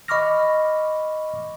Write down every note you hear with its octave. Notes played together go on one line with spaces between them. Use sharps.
D#5 B5 C#6 D6 F6 A#6